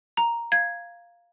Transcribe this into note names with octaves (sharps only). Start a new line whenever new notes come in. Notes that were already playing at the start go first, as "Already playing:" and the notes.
A#5
F5 G#6